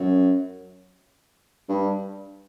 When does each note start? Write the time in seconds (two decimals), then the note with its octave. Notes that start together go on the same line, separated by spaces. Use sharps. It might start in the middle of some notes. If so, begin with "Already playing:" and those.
Already playing: F#2
1.69 G2